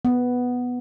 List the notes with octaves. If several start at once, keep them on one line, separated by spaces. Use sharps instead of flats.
B3